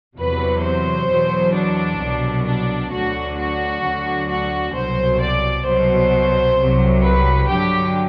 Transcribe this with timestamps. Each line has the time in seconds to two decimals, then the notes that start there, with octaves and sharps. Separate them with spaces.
0.17 E2 C3 F#3 B4
0.63 C5
1.09 E2 B2 F#3
1.54 D4
2.00 C2 B2 F#3
2.46 D4
2.92 D2 D3 F#3 F#4
3.37 F#4
3.84 D2 D3 F#3
4.29 F#4
4.74 C2 B2 F#3 C5
5.21 D5
5.66 C2 B2 F#3 C5
6.59 C2 C3 F#3
7.04 B4
7.49 G2 D3 F#3 G4